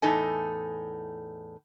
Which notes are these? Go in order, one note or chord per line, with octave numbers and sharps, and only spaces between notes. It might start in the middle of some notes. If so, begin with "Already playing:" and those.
E2 A2 D#4 A4 G#5